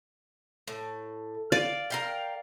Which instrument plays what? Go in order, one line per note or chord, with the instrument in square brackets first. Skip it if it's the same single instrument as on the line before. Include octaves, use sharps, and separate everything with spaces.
[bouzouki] A2
[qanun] D5 [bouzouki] F5
[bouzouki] A#4 F5 G5